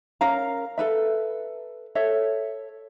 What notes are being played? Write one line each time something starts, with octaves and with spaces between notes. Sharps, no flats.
C#4 A#4 F5 A#5
A4 B4 E5
A4 C#5 E5